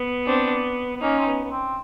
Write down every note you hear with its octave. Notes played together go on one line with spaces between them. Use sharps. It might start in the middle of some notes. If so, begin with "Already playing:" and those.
Already playing: B3
C4 D4
B3
A#3 C#4 D#4
C4
B3
B3
C4